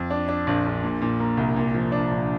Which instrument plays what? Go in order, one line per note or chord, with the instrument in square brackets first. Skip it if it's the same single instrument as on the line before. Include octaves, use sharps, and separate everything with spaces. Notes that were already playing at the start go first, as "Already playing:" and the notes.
Already playing: [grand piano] F2
D4
D4
A#1
A#1
A#2
A#2
A#3
C2
A#2
F3
D4
A#1